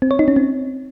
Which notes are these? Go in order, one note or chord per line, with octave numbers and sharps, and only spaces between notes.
C4
C#5
D#4
C#4
C4